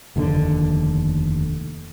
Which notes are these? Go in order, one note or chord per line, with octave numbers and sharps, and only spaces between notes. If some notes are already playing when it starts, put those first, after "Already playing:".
F1 D#2 A2 D3